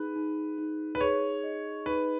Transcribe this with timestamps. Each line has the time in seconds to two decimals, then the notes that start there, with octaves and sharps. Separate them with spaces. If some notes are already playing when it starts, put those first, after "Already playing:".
Already playing: D#4 G#4 B4
0.15 D#4
0.58 D#4
0.95 B4
1.01 G#4 C#5
1.43 D#5
1.86 D#4 B4